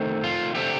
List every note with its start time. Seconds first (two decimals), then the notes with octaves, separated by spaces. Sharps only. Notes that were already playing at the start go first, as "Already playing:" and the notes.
Already playing: D#3 A3 C4
0.24 F4
0.55 D3 A3 C4 G4